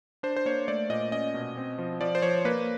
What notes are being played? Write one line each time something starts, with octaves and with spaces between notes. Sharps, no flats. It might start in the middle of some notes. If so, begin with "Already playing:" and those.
D4 C5
C5
A#3 C#5
A3 D5
A#2 D#5
C#4 D#5
B2
C4
F3
F3 D5
C5
F3 C#5
A#3 B4